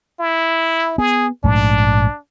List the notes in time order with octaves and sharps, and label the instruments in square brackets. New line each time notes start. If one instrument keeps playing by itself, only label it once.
[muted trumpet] E4
[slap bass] B3 [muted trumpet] G#4
[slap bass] A#1 G#2 A3 [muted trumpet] D4